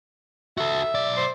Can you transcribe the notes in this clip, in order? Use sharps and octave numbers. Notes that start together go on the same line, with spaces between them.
F#4 A4 E5
B1 D5
C5